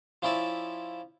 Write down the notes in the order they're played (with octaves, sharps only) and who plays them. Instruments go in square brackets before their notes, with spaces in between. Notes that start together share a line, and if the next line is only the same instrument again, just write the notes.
[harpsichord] F3 C#4 E4 D5 E5